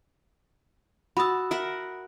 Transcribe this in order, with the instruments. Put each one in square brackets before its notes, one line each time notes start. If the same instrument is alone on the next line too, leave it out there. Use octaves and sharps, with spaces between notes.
[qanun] F#4 A5 [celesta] B5 D#6 E6
[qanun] A#4 E5 F#5